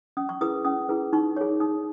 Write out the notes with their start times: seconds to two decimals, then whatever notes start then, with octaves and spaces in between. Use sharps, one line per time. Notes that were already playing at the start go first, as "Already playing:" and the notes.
0.17 C#4 D#6
0.29 C#6
0.41 E4 G#4 B4 D#6
0.65 C#4 D#6
0.89 E4 G#4 B4
1.13 D#4 C#6
1.36 G#4 C#5 C#6
1.60 D#4 D#6